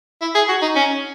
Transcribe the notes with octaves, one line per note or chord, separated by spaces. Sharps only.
E4
G#4
F#4
D#4
C#4